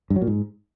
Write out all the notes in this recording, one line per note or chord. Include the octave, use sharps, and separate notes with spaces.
G2
F#3
A#2
G#2